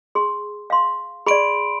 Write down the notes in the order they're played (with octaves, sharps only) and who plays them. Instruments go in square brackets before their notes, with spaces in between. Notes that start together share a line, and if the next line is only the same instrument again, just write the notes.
[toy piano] G#4 C6
F5 C6
[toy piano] G#4 D5 [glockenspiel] B5 C6 D7